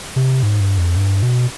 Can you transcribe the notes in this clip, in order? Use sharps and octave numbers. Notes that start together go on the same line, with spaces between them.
C3
G#2
G2
F2
G2
B2